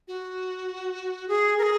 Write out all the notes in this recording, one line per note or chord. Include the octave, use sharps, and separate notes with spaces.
F#4
G#4
A#4
G#4